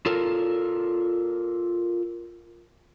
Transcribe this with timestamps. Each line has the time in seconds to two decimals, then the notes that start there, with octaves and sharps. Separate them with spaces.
0.06 F4 A4 A#4